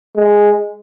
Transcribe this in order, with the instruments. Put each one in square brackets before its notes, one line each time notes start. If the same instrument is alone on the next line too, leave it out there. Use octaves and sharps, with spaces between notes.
[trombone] G#3